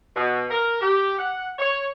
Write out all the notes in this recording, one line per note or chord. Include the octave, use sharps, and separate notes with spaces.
B2
A#4
G4
F#5
C#5